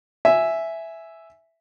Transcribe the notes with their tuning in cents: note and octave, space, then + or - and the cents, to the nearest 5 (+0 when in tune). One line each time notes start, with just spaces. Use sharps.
E5 +0 G#5 +5